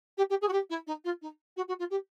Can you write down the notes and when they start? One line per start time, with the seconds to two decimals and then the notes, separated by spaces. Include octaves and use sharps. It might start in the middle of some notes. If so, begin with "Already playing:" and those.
0.18 G4
0.30 G4
0.42 G#4
0.48 F#4
0.53 G4
0.70 E4
0.87 D#4
1.05 F4
1.22 D#4
1.57 F#4
1.68 F#4
1.79 F4
1.91 G4